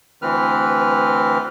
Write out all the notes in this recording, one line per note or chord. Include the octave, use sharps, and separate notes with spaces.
D2 E3 C4 B4 F6